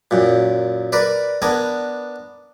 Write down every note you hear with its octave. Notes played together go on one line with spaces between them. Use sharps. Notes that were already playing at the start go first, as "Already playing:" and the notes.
F#2 A#2
A#4 B4 D5
B3 D4 A#4 G#5